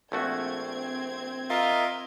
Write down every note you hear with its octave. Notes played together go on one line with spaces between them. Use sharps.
A#1 A3 C4 F#4 G#6
F4 A#4 D#5 E5